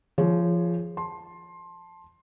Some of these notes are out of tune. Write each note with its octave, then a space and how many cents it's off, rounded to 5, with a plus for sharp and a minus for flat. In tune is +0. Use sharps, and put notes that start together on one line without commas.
F3 -20 G#4 +0 C#5 +0
A5 +0 C6 +15